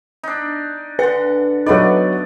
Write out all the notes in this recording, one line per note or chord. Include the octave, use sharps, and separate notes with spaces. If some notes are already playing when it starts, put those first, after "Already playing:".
D4 D#4
D3 B4 F#5
F#3 A3 B3 D#4 D5